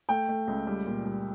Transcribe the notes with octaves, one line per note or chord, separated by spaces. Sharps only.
A3 G5
A3
C#2
G3
A#2
G3